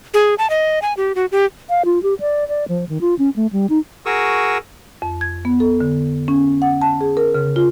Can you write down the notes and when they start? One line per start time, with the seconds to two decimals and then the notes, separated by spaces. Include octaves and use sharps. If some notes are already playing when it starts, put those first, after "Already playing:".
0.14 G#4
0.38 A5
0.50 D#5
0.82 G#5
0.97 G4
1.15 F#4
1.32 G4
1.70 F5
1.85 F4
2.03 G4
2.20 D5
2.48 D5
2.68 F3
2.89 D#3
3.01 F4
3.19 C#4
3.36 A3
3.53 G3
3.70 D#4
4.06 F#4 G#4 A#4 C#6 D#6 E6
5.02 F2
5.21 G#6
5.45 B3
5.60 A4
5.81 D3
6.28 C#4
6.62 F#5
6.82 A5
7.01 G#4
7.17 A#4
7.34 C#3
7.56 F4